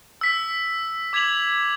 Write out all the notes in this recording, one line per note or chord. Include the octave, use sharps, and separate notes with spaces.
E6 B6
D6 G#6 B6 F7 F#7